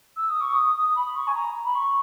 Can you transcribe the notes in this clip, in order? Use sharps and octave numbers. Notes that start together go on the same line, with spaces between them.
E6
D#6
C#6
D#6
D#6
B5
C#6
G#5
A#5
B5
C#6